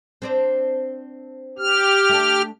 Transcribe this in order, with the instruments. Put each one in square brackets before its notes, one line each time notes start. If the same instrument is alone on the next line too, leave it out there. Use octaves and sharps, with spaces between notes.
[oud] C4 D4 C5
[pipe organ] G4 F6
[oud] A3 D4